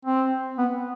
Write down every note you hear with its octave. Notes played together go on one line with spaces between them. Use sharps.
C4
B3